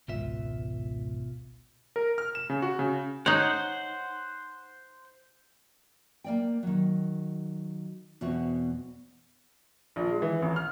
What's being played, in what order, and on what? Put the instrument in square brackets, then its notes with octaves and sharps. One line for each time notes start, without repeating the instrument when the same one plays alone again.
[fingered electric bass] G#1 C#2 [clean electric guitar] B2 F4 E5
[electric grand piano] A#4
F6
E7
C#3
F#4
C#3
[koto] D#4 C#5 [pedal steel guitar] C5 F#5
[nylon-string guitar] A#3 D5 G5
D#3 F#3
E2 B2 B3 C4 F#4
[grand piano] A#1
G#3
E3
A1
F6